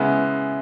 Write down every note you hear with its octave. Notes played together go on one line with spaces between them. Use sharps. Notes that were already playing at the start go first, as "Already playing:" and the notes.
Already playing: C#3 G#3 B3 E4